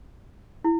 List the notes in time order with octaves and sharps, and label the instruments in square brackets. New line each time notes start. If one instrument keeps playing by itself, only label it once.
[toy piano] E4